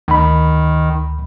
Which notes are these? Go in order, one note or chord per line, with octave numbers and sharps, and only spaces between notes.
D2 D#3 B5